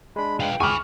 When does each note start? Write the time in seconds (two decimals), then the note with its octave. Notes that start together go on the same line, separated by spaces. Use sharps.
0.16 G#3 D4 B5
0.40 F4 B4 G5
0.60 C#2 G#4 G#5 B5 C#6 D6 F6